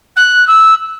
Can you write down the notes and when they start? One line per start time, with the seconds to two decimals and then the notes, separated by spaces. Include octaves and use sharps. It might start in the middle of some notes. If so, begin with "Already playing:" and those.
0.16 F#6
0.47 E6